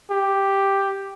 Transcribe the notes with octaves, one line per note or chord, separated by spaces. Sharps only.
G4